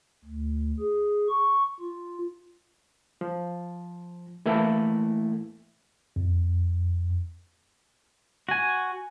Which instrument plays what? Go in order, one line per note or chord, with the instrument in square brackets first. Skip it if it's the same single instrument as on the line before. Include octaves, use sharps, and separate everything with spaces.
[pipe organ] D2
G#4
C#6
F4
[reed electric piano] F3
E3 A3 A#3 E4
[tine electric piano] F2
[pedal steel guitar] F#4 G#5